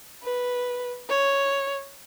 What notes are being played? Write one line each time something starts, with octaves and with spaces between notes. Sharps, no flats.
B4
C#5